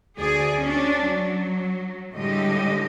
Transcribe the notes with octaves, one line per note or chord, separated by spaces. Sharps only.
D2 G#4 D5
C#4 D4
F#3
A2 D3 G3 G#3 G4 D#5